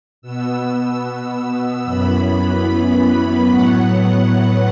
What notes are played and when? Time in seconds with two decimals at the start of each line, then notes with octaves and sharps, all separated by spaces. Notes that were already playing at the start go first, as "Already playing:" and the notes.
0.22 B2 B3 E6
1.84 F#2 E3 B3 B5
3.46 A2 F#3 B3 F#5